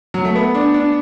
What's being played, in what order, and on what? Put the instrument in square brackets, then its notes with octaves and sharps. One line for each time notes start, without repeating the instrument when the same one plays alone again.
[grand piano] F#3
A3
B3
D4
D4